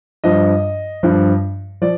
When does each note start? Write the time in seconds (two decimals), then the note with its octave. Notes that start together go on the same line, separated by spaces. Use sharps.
0.24 G2 F3 D#5
1.03 G2 F3
1.82 F3 D5